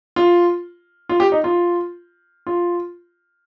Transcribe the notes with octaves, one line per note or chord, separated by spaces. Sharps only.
F4
F4
G4
D#4
F4
F4